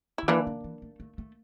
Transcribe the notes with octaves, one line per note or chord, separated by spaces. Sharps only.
D3 E4
E3 A#3 D4
D3
E3
A3
A3
A3